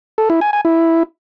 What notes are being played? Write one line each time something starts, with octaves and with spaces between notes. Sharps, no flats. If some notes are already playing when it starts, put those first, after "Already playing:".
A4
E4
G#5
G#5
E4